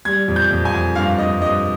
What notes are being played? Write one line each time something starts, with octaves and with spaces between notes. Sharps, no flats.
G3 G#6
F2
G6
F2
G#5
F2
G2 F5
G2 D#5
G2 D#5